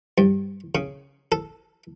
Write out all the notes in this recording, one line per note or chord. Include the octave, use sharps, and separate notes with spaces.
G2
C#3
A4